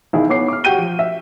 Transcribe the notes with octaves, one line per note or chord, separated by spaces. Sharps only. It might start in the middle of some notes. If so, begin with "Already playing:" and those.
B1 D#3 E4 G#4
B3 C#5 D6 C7
D6 F6
F#4 G4 G5 G6 D#7 G7
F3
E5